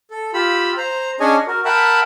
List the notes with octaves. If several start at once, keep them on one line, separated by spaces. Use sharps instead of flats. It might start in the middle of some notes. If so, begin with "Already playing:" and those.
A4
F4 G4 B5 E6
C5 A#5
C#4 D4 G#4 C#5 D#5 G#5
F#4 A#4
A#4 E5 F#5 G5 A5 B5